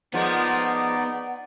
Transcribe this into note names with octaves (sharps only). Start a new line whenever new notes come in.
F3 G#3 A#3 B3 D#4 D5 F#5